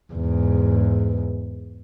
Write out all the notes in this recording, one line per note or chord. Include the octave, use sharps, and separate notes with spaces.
E2 G#2